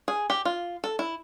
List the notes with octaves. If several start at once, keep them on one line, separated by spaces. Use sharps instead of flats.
G#4
G4
F4
A4
E4